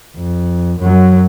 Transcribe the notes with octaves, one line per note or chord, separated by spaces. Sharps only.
F2
F#2 F#3